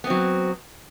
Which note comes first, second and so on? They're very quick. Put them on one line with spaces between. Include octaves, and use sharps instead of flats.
B3 C4 F#3